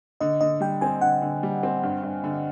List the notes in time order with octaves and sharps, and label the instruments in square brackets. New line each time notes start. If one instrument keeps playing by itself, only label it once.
[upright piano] D3 [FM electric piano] D#5
[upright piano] D3 [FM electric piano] D#5
[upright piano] G3 [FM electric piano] G5
[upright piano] C4 [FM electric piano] G#5
[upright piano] D3 [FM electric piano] F#5
[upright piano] D3
G3
C4
G2
G2
D3